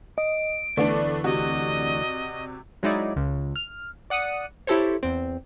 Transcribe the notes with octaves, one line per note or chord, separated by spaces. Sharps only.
D#5 D7
D2 D3 E3 A3 B3 D4 D5
C3 F#4 D#5
F#3 G#3 D#4 E4 D5
C#2
F6
D5 F#5 D#6 C#7 D#7
E4 G4 A4 C5 C#5
E2 C4